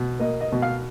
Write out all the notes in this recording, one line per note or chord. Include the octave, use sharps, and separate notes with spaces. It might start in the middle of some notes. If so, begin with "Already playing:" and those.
Already playing: B2
A#3 D#5
D#5
B2
F5